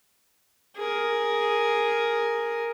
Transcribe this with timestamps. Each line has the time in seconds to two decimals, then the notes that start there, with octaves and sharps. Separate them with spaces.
0.76 G#4 A#4